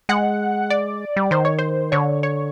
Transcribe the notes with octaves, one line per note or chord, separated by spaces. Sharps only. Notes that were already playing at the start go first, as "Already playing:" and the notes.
G#3 F#5
D5
G3
D#3 C5
C#5
C5
D3 C#5
C#5